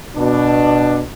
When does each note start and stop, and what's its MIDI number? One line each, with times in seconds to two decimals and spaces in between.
0.16 1.00 47
0.16 1.00 62